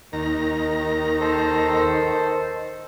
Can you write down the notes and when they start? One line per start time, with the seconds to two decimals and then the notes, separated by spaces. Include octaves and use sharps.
0.13 D#2 D#3 A#5
1.20 A4 C5